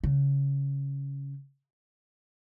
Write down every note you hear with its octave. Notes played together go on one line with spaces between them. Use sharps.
C#3